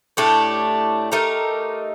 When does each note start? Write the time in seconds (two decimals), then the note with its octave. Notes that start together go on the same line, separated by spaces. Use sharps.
0.17 A2 A3 D4 G4
1.12 A3 D#4 G4 A#4